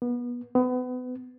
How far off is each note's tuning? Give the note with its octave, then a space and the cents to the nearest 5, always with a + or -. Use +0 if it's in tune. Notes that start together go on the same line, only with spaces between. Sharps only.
B3 -25
B3 +30